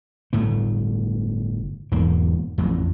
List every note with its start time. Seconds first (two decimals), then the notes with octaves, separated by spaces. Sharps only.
0.33 G1 A2 A3
1.92 E1 E2 G#2 A#3
2.58 A1 F2